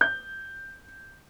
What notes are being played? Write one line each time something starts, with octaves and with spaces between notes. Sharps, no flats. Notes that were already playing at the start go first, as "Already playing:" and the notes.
G6